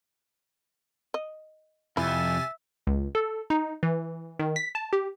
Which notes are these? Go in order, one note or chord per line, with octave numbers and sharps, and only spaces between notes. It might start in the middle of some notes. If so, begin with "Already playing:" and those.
D#5
F2 C3 E4 E5 G#5 A6
C#2
A4
D#4
E3
D#3
B6
A5
G4